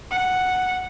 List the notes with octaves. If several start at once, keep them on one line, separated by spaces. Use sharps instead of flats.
F#5